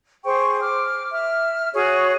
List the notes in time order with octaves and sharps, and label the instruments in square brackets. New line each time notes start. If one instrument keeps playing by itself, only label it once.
[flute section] G#4 C5 G5 C#6
D6 F6
E5 F6
F#4 G#4 C#5 C#6